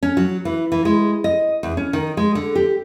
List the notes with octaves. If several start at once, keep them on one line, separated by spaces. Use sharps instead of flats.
C#4
F#3
E3
E3
G#3
D#5
E2
C#4
D#3
G#3
D3
G4